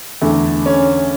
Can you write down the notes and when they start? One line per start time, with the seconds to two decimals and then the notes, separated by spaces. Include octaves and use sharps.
0.21 E2 D3 A3
0.66 C#4